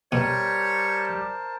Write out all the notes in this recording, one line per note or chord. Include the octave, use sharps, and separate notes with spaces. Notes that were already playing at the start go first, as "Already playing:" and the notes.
B2 G3 G4 A#4 C5 C#5 A5